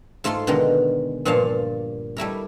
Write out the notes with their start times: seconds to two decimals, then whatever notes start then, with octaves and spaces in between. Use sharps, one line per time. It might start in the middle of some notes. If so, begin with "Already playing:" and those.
0.24 G#2 A3 F4 A5 C6
0.47 B2 D3 D#3 G#3 A#4
1.25 G2 A#2 F3 F5 A5
2.17 G3 A3 E4 A#4